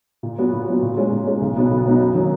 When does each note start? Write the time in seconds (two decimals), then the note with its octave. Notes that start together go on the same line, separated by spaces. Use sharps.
0.23 A#2
0.38 F#3 B3 F#4
0.52 A#2
0.67 F#3 B3 F#4
0.82 A#2
0.97 G#3 C#4
1.11 A#2
1.27 G#3 C#4
1.41 B1
1.56 B2 F#3 B3 D#4
1.71 B1
1.85 B2 F#3 B3 D#4
2.00 F#2
2.14 D#3 F#3 A#3